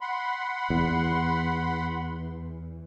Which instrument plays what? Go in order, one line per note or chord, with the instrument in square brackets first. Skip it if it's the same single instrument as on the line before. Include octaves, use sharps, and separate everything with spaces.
[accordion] F#5 B5 C6
[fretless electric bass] E2